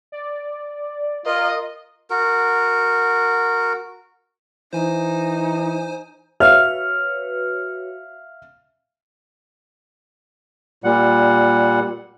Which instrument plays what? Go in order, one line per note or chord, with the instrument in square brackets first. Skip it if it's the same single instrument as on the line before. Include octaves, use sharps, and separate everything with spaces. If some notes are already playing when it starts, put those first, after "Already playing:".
[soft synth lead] D5
[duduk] F4 [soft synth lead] A#4 [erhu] D#5
[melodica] F#4 A#4
[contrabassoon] E3 [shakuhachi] D#4 [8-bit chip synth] C5 G#5
[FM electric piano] F#4 B4 C#5 [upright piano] E5 F5 F6
[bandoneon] A#2 G3 F#5